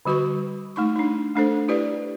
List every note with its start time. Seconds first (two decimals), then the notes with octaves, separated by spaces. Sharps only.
0.06 D3 G3 F#4 B4 C#6
0.76 A3 D#4 C#6
0.96 D4 D#4
1.36 A3 D4 A4 C5
1.68 E4 G4 B4 D5